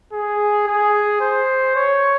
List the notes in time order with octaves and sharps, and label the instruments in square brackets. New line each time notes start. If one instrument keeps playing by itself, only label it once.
[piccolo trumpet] G#4
G#4
C5
C#5